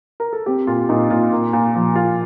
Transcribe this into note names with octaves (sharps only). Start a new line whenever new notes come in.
A#4
A4
C4 G4
A#2 F4
A#2 D#4
A#2 F4
A#3
A#2
F3
A#2 F4